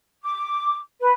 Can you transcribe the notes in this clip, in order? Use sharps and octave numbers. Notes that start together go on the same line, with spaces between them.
D6
B4